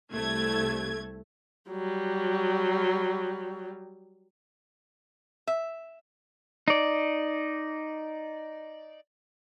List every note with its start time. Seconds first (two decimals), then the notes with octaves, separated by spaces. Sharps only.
0.12 C2 A3 G#6
1.70 F#3 G3
5.47 E5
6.68 D#4 D5